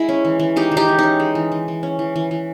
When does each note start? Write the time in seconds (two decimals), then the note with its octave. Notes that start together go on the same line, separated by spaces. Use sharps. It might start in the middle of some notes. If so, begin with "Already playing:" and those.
Already playing: G#3 E4
0.09 C#4
0.25 E3
0.39 E3
0.56 G#3 D#4 G4
0.71 E3
0.77 D#4 G4
0.88 E3
0.99 C#4 D#4
1.20 G#3
1.35 E3
1.52 E3
1.68 E3
1.83 C#4
1.99 E3
2.16 E3
2.31 E3